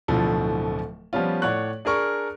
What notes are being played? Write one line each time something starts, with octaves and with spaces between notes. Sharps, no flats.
D1 B2 D3 F3 E4 A4
F3 G3 B3 C#4 F4
A2 C#5 D5 F#5 C#6 F#6
D4 G#4 A#4 C#6